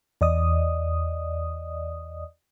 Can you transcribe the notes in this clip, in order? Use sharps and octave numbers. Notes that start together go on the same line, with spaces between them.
E2 D5 D#5 D#6